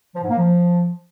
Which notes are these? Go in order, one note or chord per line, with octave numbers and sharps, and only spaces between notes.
F3
G#2
A#3
F3